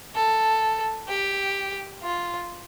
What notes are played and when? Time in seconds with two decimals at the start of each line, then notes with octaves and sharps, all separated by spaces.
0.15 A4
1.08 G4
2.03 F4